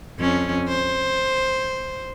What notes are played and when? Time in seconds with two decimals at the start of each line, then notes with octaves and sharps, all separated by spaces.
0.18 F2 C#4
0.69 C5